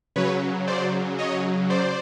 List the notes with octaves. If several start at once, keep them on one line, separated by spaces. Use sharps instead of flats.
C#3 F#3 B4 C#5
C5 D5
C#5 D#5
C5 D5